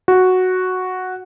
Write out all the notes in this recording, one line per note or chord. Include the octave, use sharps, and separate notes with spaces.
F#4